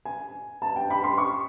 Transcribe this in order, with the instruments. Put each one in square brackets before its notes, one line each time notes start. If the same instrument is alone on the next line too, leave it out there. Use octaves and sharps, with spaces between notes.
[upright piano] G#5
A5
G5
B5
C6
C#6